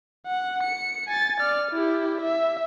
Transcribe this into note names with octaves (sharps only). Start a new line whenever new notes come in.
F#5
C#7
G#5 A6
D5 F6
E4 G4
E5